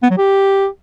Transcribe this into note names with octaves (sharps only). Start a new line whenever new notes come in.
B3
F#3
G4